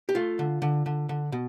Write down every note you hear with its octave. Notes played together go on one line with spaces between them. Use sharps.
G4
A3 F4
D3
D3
D3
D3
B2